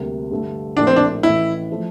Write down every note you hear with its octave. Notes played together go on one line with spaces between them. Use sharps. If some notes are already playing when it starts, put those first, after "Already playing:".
Already playing: D2 C3 G3 A#3
G2 D3 A3
A#1 A2 F3 A#3 D4
C4
D4
A1 A2 E3 E4
F3 A3